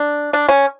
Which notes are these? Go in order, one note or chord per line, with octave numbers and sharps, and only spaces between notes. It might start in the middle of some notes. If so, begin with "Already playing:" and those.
Already playing: D4
D4
C#4